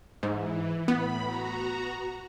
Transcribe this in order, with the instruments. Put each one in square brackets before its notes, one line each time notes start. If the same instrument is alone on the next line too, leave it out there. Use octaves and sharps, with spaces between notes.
[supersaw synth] G#2 [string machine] E3
[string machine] A2 B5 [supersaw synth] B3
[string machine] F#4 A#5